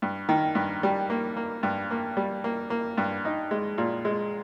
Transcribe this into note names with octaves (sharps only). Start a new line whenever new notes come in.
G2
D#3
G2
G3
A#3
A#3
G2
A#3
G3
A#3
A#3
G2
D#4
G#3
A#2
G#3